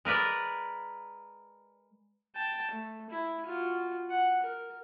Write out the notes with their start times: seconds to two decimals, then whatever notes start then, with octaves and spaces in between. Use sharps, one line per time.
0.05 G#3 A#4 B4 D5
2.35 G5 A5
2.71 A3
3.10 E4
3.46 F4 F#4
4.10 F#5
4.43 A#4